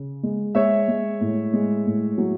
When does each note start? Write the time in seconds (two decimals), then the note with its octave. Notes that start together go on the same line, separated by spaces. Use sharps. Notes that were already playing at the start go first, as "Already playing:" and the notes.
Already playing: C#3
0.23 G#3
0.55 G#3 C#5 E5
0.88 G#3
1.21 A2
1.53 G#3
1.86 A2
2.18 F#3